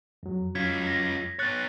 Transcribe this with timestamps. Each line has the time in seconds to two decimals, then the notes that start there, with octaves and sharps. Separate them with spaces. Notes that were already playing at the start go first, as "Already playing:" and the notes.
0.23 F2 F#3
0.55 C#4 F4 G#6 B6
0.87 A#6
1.39 B3 C#5 F#6 A6